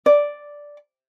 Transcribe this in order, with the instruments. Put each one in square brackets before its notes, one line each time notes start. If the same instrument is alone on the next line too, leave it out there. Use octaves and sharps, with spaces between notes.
[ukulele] D5